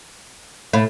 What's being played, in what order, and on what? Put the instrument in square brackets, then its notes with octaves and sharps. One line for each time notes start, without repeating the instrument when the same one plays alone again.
[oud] A2